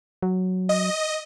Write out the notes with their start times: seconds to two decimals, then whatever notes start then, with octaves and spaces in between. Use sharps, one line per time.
0.23 F#3
0.69 D#5